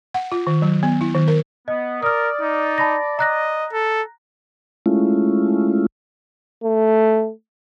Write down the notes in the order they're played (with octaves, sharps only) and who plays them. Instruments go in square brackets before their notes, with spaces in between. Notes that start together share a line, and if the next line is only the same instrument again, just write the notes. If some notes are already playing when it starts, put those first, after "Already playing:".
[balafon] F#5
F4
D#3
F#3
B3
E4
D#3
A#4
[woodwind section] B3 [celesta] D#5
[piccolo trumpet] A#4 [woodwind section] D5 [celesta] D#6 F6
[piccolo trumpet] D#4
[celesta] A5 B5 A#6
[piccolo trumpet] D#5 [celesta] A#5 F#6 A#6
[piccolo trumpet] A4
[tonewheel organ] G#3 A3 C#4 E4 F4
[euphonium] A3